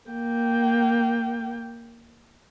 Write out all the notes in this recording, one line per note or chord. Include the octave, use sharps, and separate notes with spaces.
A#3 G5